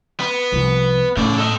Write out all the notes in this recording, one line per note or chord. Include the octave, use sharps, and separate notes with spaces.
B3
C2 F3
A2 C#3 D5
A4 D#5